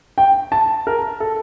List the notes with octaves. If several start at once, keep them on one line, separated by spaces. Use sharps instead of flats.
G5
A5
A#4
A4